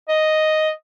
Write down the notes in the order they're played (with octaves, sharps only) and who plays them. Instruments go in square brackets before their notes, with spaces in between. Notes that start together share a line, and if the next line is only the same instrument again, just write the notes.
[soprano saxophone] D#5